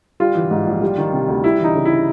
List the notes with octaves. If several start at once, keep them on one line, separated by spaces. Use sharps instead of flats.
G3 F4
E3
G#2
A#1
G3
D#3
C3
D2
G3 E4
E3 D#4
C#3
E4